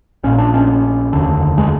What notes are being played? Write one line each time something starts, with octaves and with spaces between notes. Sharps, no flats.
A#1 A#2 C#4
D4
C#4
F1 D#2 D3
G#3